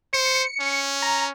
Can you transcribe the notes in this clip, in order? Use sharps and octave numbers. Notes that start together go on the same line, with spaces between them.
C5 C#7
C#4
A#5